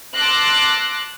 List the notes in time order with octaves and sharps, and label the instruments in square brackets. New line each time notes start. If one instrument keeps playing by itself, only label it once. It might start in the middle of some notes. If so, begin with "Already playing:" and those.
[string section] A5 C6 D6 E6 F#6 A#6